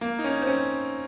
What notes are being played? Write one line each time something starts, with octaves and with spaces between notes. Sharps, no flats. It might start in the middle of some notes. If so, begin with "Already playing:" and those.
A#3
D#4
C#4
C4
C#4